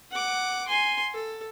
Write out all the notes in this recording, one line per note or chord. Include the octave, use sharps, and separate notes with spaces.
F#5 D6
G#5 C6
A4